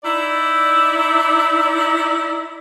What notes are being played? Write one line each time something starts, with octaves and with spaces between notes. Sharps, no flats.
D#4 E4 D5